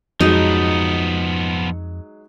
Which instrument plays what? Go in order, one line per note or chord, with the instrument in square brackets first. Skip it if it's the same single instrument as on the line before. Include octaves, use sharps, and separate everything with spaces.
[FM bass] F2 [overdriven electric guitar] F3 B3 [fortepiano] F#3 G#3 [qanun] D#4